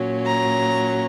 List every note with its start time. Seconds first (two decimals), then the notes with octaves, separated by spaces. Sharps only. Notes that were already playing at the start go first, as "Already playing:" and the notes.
Already playing: A#2 F#3 C#4
0.26 A#5